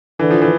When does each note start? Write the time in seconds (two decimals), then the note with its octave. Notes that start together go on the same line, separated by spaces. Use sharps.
0.19 D3 E3
0.31 F3
0.42 E3